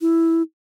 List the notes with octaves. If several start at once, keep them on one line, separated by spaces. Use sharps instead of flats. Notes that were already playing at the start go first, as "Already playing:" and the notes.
E4